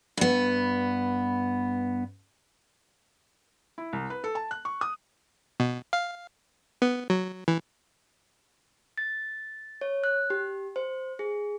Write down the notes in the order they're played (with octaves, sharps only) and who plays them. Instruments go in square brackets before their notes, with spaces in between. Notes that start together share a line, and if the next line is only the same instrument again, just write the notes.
[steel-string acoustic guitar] G2 B3
[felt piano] E4
C2
B4
A4
A5
F#6
C#6
D#6
[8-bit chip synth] B2
F5
B3
F#3
E3
[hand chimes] A6
C#5
F#6
G4
C5
G#4